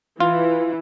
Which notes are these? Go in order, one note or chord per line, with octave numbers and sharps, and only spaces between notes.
E3 F4